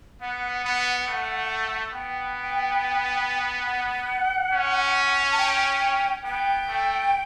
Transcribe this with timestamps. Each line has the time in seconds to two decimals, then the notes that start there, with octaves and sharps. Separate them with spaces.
0.21 B3 F#5
0.65 B3
1.07 A3
1.93 B3 G5
3.62 G5
3.66 F#5
4.53 C#4
5.32 A5
5.38 G5
6.24 B3 G5
6.68 A3